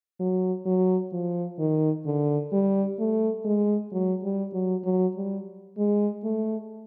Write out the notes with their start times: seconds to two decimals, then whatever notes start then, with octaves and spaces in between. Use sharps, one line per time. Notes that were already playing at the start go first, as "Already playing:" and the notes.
0.20 F#3
0.66 F#3
1.13 F3
1.59 D#3
2.06 D3
2.52 G3
2.99 A3
3.45 G#3
3.92 F#3
4.23 G3
4.54 F#3
4.85 F#3
5.16 G3
5.78 G#3
6.24 A3